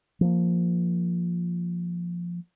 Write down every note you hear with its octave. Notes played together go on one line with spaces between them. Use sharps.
F3 A#3